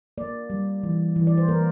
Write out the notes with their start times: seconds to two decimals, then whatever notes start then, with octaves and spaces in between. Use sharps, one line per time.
0.18 A#3 D5
0.50 G3
0.83 E3
1.16 E3
1.27 D5
1.38 C5
1.48 A#3 A#4